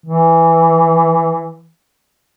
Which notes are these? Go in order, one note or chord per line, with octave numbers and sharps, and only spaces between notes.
E3